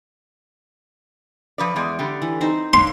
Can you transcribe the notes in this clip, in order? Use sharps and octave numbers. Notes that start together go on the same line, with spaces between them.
F3 B4 D5
E2 G#3 D5
D3 G3
E3
C4 D#4 C5
D3 A#3 C#5 C6